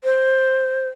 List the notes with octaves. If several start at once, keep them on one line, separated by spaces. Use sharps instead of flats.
C5